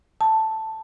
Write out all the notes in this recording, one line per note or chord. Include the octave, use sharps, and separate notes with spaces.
A5